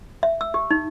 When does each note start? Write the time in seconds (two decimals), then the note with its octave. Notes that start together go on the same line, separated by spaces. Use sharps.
0.23 E5
0.41 E6
0.54 G4
0.71 D#4